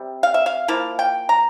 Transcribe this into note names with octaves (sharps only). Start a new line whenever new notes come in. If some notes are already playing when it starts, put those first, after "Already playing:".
Already playing: C3 G3
F5
E5
F5
F3 A#3 E4 F5
G5
A#5